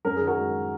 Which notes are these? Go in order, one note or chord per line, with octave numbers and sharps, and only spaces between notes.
F#2 A#4
D#3 G#4
F#4 A#4
G#3